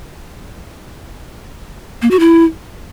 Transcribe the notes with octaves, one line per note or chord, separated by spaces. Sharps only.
A#3
F#4
E4